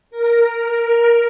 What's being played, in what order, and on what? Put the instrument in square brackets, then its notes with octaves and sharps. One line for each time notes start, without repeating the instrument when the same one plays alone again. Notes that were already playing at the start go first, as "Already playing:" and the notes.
[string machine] A#4